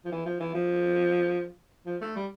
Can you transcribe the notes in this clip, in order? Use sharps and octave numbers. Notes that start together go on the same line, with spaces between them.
F3
E3
F3
E3
F3
F3
A3
G3